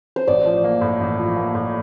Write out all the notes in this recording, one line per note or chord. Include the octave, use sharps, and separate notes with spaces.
C5
A1 D5
F3
A#3
A2
A1
F3
A#3
A2